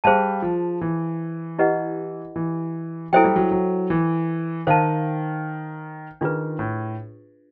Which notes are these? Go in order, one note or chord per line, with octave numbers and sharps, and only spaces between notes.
G3 G#4 C5 F5 A5
F3
E3
E4 G4 B4 D#5 F#5
E3
F#3 E4 A4 C5 E5 G5
G3
F#3
F#3
E3
D#3 C5 F5 A5
D#3 D4 F4 G#4 B4
A2